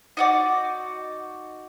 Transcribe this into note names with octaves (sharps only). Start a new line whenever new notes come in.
D#4 F#4 D5